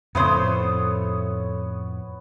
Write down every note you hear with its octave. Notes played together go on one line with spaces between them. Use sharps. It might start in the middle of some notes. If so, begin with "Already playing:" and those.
F2 A2 C#3 A3 B3 C5 C#5 D#6